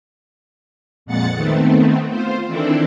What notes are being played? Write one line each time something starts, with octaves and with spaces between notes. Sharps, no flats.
F2 A#2 G#3 F#5 A6 C#7
D#3 A3 B3 C4
F4 C5
D#3 E3 C4 D4 E4 A4